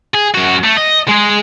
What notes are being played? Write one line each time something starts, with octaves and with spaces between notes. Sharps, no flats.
G#4
F#2 F#4
A3
D#5
G#3 G#4